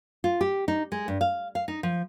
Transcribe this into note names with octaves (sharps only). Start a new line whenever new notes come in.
F4
G4
D#4
G#3
G2
F5
F5
D#4
F3